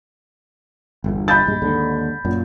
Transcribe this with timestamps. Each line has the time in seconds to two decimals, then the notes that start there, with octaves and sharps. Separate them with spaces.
1.04 G1 E2
1.28 B5 G6 A6
1.47 A#1 G2 G#3
1.62 D#2 G#2 D3
2.25 F#2 A#2 F#3